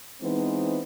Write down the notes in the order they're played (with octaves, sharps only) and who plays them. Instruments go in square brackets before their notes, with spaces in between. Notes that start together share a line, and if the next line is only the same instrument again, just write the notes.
[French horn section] E3 G#3 B3 C4 D#4